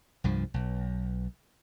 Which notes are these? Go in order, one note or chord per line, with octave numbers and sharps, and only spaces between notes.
C2 G2 F3
B1